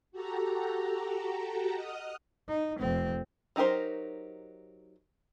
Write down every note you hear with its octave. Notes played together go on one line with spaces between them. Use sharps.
F#4 G4 A4 A#5
D#5 F#5 D#6 F6
D#4
F1 C4
F#3 D#4 G4 A#4 C5